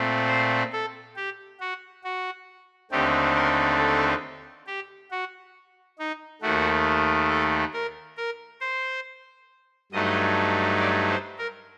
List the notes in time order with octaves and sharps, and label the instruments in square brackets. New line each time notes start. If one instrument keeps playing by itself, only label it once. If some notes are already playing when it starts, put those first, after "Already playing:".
Already playing: [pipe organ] A#2 A3 C4
C5
A4
G4
F#4
F#4
D#2 D3 A3 C4 D#4 G4
A#4
A4
G4
F#4
D#4
D#2 D#3 A3 F#4
A4
A#4
A#4
C5
G2 F#3 A3 D#4 D#5
D5
C5
A#4